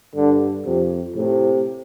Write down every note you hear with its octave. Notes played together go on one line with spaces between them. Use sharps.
G2 D3
F2 C3
A2 C3